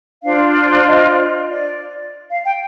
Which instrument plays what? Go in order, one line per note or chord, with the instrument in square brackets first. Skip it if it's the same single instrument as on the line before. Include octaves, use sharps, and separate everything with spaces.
[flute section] D4 F4 C5 F5
D#5
D5
F5
G5